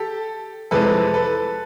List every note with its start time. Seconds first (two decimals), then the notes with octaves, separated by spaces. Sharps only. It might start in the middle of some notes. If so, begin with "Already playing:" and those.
Already playing: G4 A4
0.71 F2 C3 E3 G#3 A4 B4
1.14 A4 B4